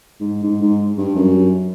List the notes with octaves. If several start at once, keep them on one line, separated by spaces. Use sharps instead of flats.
G#2
G#2
G#2
G2
F#2